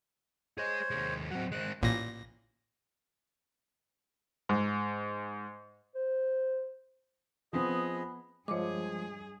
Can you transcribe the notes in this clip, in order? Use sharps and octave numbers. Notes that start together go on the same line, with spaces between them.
G#4 C5 C#5 D#5
D#2 G#3
F#3 C4 F#5
G#3 C4 F#6
A1 A#2 A#6
G#2
C5
F3 B3 C4 G#4 D#5
G2 F3 G#3 G#4 C#5 D#5 D6